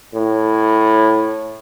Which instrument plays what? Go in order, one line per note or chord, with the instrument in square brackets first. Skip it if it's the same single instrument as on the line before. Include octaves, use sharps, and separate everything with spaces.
[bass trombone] A2